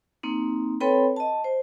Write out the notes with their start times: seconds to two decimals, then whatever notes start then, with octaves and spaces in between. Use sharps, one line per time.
0.23 A#3 C4 D#4
0.81 C4 A4 B4 C#5 G5 B5
1.16 D#5 A5
1.44 C5